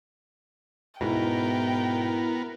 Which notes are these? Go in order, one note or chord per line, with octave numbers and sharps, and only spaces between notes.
G#2 B2 B3 E4 A#4 G5